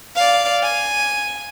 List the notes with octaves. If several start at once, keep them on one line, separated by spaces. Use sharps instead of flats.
D5 F5
G#5